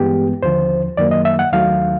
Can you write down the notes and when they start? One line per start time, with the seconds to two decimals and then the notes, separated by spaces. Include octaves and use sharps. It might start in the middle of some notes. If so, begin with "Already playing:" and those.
Already playing: G2 E3 G#3 B3 G4
0.43 D#2 D3 F3 C5
0.97 F#2 D#3 F#3 A#3 D5
1.11 D#5
1.25 E5
1.39 F#5
1.53 D#2 D#3 F#3 A3 F5